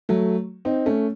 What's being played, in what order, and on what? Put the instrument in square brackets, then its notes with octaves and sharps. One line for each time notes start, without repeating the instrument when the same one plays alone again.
[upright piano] F#3 A3
C4 D#4
A3 C#4